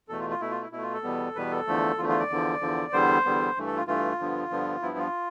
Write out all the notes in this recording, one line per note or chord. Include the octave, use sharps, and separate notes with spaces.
E2 B2 A3 A4
F4
F4
B2 A3 E4
F4
E4
B2 A3 E4
F4
A4
E2 B2 G3 B3
E2 B2 G3 B3 B4
A4
E2 D3 F3 A3
E2 D3 F3 A3 F4
F4
D5
E2 D3 F3
E2 D3 F3
E2 D3 G3 B3 C5
E2 D3 G3 B3
G2 E3 A3
A4
F4
G2 E3 A3 F4
G2 D3 F3 B3
G2 D3 F3 B3
G2 F3 B3 E4
F4